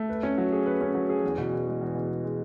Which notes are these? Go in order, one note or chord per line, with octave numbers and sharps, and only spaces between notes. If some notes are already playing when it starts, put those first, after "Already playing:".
Already playing: A3
B4
C#4
F#3
G#4
B4
C#4
F#3
G#4
E2
B2
E2
G#3
E2
B2
E2
G#3